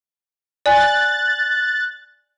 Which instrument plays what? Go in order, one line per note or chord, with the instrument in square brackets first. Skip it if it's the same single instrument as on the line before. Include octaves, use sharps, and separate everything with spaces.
[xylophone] D5 G#5 [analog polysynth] F#6 A6